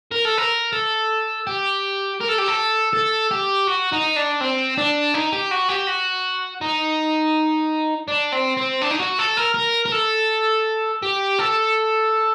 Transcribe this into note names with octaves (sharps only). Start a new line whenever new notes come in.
A#4
A4
A#4
A4
G4
A#4
A4
G4
A4
A4
G4
F#4
D#4
D4
C4
D4
D#4
G4
F#4
G4
F#4
D#4
D4
C4
C4
D4
D#4
F#4
A4
A#4
A#4
A#4
A4
G4
A4